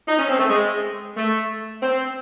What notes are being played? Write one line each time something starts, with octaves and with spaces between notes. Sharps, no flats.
D#4
C#4
C4
A3
G#3
A3
C4